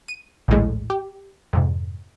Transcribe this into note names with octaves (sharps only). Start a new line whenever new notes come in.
D#7
A#1 D#2 A2 G#3
G4
F2 G#2 C3